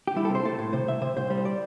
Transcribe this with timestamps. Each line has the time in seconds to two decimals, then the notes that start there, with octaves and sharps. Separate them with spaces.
0.07 G4
0.16 G3 E4
0.25 A4
0.30 C3
0.35 C5
0.45 A3 A4
0.59 A2
0.73 C3 C5
0.88 C2 E5
1.02 C3 C5
1.17 C2 C5
1.30 G3
1.38 C5
1.45 D5